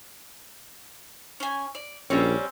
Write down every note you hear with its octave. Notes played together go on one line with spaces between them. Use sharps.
C#4 G#5
D5
A#1 G3 C4 C#4 G5